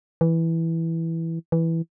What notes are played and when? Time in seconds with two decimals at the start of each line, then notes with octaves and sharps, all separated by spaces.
0.21 E3
1.52 E3